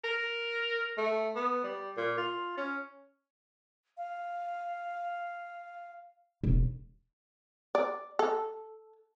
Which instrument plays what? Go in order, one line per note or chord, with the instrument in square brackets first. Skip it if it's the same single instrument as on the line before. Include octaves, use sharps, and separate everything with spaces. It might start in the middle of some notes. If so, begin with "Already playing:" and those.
[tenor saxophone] A#4
A3
B3
G3
A#2
F4
C#4
[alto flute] F5
[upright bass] E1
[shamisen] D5
A4